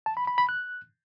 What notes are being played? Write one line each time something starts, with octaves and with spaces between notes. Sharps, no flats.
A5
B5
B5
B5
F#6